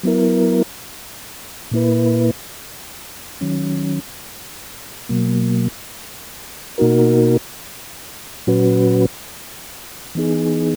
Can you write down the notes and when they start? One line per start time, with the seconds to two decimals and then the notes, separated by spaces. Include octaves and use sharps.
0.03 F#3 B3 E4 A#4
1.71 A#2 A#3 E4 B4
3.41 D#3 F#3 C#4
5.09 B2 F#3 A#3
6.78 B2 A#3 D#4 F#4 A#4
8.47 A#2 F#3 C#4 F#4 B4
10.15 E3 B3 D#4 G#4